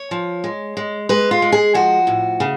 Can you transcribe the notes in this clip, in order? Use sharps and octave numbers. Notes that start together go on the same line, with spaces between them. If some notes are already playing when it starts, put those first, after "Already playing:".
Already playing: C#5
F3
G#3
G#3
G#3 B4
F4
G#3
G#4
F3 F#4
A2
C#3